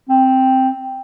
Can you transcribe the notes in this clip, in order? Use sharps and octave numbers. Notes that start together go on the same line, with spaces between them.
C4